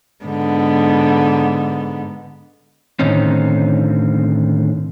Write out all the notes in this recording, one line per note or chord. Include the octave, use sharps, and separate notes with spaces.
G#2 D3 B3
A2 D3 D#3 C4 C#4 D#4